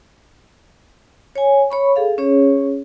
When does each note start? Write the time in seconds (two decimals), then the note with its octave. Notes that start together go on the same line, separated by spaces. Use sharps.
1.36 C#5 G#5
1.70 C#5 B5 C#6
1.96 G#4 A4 F5
2.18 C#4 G#4 C#5